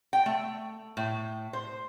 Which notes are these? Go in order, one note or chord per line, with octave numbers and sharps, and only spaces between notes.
G5
A3
A2
C5